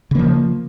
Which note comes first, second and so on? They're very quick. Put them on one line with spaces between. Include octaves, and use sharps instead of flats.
C#3 A#3 F3